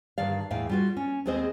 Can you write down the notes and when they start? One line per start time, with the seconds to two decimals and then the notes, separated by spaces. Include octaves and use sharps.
0.18 G2 D3 D#3 D5 F5
0.51 E2 A2 E5 F5 G5
0.69 G3 F4 F#4
0.97 C#4
1.26 D#2 G#3 C4 G#4 C5 D#5